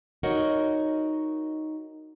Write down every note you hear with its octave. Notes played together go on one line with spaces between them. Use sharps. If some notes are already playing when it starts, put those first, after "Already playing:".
D#4 F#4 A#4 C#5 D#5 F#5